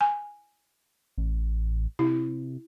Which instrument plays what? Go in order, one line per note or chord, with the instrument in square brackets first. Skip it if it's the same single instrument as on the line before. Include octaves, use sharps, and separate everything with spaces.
[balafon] G#5
[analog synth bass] A1
[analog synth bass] C3 [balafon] E4